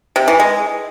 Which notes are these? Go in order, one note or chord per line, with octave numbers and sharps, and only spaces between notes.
C3
E3
G#3